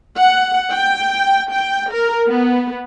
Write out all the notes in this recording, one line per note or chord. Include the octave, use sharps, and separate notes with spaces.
F#5
G5
G5
A#4
B3